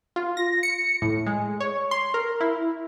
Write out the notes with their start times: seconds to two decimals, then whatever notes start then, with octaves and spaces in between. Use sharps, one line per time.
0.16 F4
0.37 A#6
0.63 C#7
1.02 A2
1.26 G#3
1.60 C#5
1.91 C6
2.14 A#4
2.41 E4